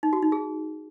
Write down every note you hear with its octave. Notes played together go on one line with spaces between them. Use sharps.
D#4
F#4
D#4
G#4